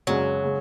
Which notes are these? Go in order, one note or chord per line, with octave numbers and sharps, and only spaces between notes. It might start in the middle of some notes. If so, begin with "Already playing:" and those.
F#2 C#3 F#3 G#3 C#4
C#3 G#3